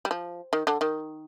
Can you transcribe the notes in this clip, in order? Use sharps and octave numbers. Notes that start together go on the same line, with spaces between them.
G3
F3
D#3
D3
D#3